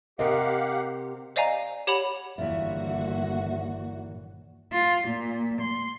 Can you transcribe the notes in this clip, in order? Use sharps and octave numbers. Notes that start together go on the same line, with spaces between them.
C3 G4 A#4 D#5 F5 F#5
C5 D5 D#5 F5 G#5 A#5
G4 C#5 F#5 B5 F7
G1 D#2 A#2 E3 F#4 E5
F4
A#2
C6